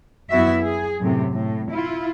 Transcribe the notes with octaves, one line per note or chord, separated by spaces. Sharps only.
F#2 B3 E4 F#4 E5
G#4
F#2 A2 C3
A2
E4 F4